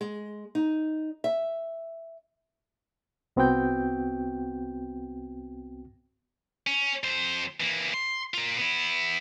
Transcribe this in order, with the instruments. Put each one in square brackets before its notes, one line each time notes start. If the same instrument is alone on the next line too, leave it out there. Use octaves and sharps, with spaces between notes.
[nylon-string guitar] G#3
D#4
E5
[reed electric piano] C2 B3 C4 F#4 G5 G6
[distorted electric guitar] C#4
F2 C5
E3 A#3
C6
F4 A#4
B3 E4